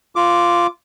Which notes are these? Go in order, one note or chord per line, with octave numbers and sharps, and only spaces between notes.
F4 D6